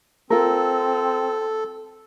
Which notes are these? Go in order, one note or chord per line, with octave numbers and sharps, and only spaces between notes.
C4 F4 A4 A#4